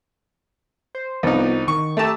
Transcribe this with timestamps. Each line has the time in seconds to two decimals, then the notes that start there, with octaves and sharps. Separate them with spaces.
0.95 C5
1.23 C2 F3 B3 D#4
1.68 D#3 C#6
1.97 A3 G4 A5 A#5 E6